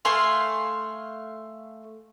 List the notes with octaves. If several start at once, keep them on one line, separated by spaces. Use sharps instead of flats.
A3 F5 G#5 C6